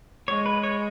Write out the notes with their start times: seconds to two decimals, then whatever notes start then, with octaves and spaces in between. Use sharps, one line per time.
0.28 G#3 C#5
0.46 B4
0.63 C#5